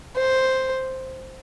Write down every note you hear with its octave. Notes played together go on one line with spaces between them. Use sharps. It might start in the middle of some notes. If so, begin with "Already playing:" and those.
C5